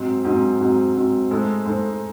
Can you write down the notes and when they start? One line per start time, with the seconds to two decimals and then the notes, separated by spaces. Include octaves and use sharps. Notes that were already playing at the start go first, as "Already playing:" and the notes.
Already playing: G#2 F#3 C4
0.24 G#2 F#3 C4
0.60 G#2 F#3 C4
0.96 G#2 F#3 C4
1.30 A2 G#3 D#4 A4 C5
1.66 A2 G#3 D#4 A4 C5